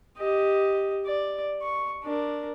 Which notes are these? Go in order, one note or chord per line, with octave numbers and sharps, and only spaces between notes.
G4 D#5
D5
C#6
D4 A#4